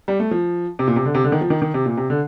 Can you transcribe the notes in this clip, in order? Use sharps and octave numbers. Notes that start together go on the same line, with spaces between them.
G3
A3
F3
C3
A#2
C3
D3
C3
D3
D#3
F3
D#3
D#3
C3
A#2
C3
D3